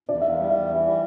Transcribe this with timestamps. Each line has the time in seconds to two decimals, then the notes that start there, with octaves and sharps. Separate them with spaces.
0.09 E2 D5
0.21 E2 E5
0.29 F5
0.39 G3
0.49 E2 E5
0.70 E3
0.85 G3